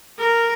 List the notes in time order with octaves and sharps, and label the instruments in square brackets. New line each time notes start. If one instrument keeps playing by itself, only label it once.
[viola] A#4